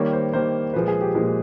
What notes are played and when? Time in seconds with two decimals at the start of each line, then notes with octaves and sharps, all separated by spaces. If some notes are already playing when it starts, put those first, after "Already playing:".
Already playing: D#3 G3 A#3 C#5
0.13 C5
0.33 D#3 G3 A#3 C5
0.74 A#2 F3 G#3 B4
0.88 G#4
1.01 G4
1.15 A#2 F3 G#3